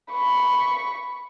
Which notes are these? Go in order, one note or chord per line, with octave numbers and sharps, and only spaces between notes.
B5 C#6